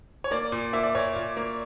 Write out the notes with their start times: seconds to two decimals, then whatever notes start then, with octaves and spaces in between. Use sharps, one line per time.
0.24 C#5
0.31 A#3 D5
0.52 A#2
0.73 A#3 E5
0.84 D5
0.95 A#2 C#5
1.16 A#2
1.37 A#3